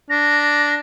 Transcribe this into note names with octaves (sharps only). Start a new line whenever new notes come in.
D4 A#6